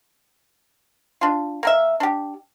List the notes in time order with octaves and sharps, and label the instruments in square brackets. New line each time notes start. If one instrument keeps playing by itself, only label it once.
[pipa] D4 F4
A#3 A#4 E5
D4 G4